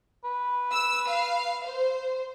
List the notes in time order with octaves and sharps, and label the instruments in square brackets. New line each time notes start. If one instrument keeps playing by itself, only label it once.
[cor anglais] B4
[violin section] E6
F5
C5